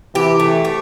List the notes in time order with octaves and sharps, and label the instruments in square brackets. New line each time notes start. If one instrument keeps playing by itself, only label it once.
[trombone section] C3 E3 [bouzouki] G4
[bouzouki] A3
G4